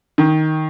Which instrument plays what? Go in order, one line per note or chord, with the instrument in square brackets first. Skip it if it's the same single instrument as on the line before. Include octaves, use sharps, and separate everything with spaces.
[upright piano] D#3